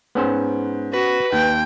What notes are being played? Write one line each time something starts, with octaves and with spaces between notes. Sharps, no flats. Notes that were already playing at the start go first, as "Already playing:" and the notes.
G#2 B3 C#4 C5
F#4 B4
D#2 G5